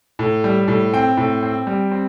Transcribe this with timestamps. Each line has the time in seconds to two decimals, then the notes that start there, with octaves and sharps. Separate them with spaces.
0.19 A2
0.44 G3
0.68 A2
0.93 C4 G5
1.17 A2
1.43 C4
1.67 G3
1.92 C4